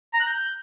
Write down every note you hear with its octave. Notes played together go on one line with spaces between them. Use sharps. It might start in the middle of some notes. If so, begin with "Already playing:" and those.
A#5
F#6
G6